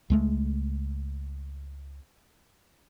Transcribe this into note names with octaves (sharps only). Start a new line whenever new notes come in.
C#2 G#3 A3